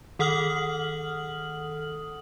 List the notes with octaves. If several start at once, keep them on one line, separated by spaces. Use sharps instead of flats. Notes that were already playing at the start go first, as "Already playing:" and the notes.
D#3 A4 F#5 D#6 F6 F#7